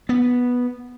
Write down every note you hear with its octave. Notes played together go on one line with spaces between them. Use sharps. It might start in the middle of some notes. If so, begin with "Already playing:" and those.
B3